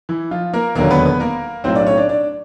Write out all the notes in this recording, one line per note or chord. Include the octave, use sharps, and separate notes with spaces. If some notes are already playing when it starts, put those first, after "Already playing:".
E3 E4
F3 F4
A#3 A#4
E1 D#2 D3 F#3 A#3 A#4
B3 B4
B3 B4
A#3 A#4
B1 A2 F#3 C4 C5
D4 D5
C#4 C#5
D4 D5
D4 D5